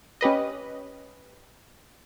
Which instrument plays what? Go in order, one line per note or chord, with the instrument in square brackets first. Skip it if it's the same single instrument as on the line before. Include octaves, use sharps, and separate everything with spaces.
[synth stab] C#4 G4 B4 D#5